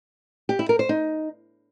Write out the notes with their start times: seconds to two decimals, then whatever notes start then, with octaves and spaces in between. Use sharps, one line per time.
0.49 G4
0.59 E4
0.69 A#4
0.79 C5
0.89 D#4